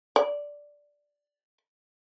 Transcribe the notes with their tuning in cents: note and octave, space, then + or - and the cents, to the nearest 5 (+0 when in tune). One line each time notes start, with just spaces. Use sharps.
D5 -5